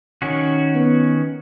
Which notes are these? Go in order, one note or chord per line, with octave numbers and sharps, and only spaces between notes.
D#3 C#4 F#4
B3